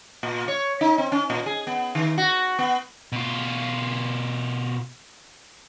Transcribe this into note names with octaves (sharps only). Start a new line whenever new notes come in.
A#2
C#5
D#4
C4
C#4
A#2
G#4
B3
D#3
F#4
B3
B2 F4